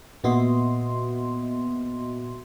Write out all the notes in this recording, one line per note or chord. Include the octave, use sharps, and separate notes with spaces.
A#2 B3 F#4 D#5 E5 C6